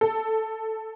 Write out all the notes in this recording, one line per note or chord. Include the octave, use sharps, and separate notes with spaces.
A4